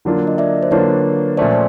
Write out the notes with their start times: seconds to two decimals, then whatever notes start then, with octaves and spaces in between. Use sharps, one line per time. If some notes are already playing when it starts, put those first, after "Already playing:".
0.05 D3 F#3 A#3 D4 F4
0.27 D#5
0.38 D5 E5
0.63 C5
0.71 D3 F#3 A#3 D4 F4 B4 C#5
1.37 A#2 F3 A3 C#4 C5 D5